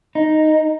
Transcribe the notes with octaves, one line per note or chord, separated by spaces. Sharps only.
D#4